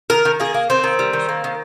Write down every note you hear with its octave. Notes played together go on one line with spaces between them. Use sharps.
D#3 A#4
D#3
A#3 G#4
A#3
D#3 C4
D#3
G3
D#3
A#3
D#3